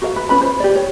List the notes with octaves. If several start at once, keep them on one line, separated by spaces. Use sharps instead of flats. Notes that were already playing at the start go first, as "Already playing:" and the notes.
F#4 A#4 D5 F5
B4
C#4 F4 B4 B5
C5
G4 D5
C#5